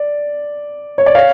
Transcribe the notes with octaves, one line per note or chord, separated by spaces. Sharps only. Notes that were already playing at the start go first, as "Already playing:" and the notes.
Already playing: D5
C#5
D5
C#5 F5